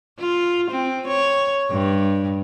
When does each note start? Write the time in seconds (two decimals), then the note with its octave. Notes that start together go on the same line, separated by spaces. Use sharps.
0.19 F4
0.71 C4
1.08 C#5
1.71 G2